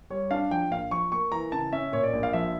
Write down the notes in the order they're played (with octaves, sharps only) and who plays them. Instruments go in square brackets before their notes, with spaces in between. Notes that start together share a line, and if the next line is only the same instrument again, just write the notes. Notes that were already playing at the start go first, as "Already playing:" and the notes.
[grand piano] G3 C#5
D4 F5
F3 G5
A#1 F5
F3 C#6
A#3 C#6
E3 A#5
C#3 A5
C#4 E5
A#2 C#5
D5
A#1
F5
F3 E5